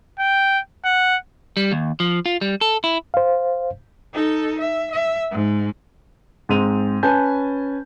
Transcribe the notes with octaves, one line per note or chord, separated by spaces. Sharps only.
G5
F#5
G3
D#2
F3
F4
G3
A4
E4
C5 F5
D#4 A4
E5
E5
G#2
G#2 G#3 C4 D#7 F7
C#4 B4 G#5 A5 G6